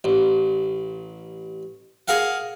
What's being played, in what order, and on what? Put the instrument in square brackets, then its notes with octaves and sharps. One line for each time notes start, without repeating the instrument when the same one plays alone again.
[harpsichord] A1
G#4 A#4 F5 F#5